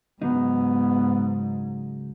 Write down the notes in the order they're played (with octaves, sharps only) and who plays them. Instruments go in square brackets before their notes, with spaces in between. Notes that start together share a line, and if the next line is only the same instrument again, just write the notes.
[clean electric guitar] C#2 F#3 D#4 [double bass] G#2 [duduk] B3